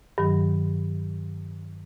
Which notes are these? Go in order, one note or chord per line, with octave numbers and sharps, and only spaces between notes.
G2 D#3 F#3